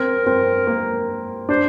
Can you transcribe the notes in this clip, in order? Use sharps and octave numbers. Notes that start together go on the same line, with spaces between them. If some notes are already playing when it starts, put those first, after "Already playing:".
Already playing: C4 A#4
C4
A#3
D4 C5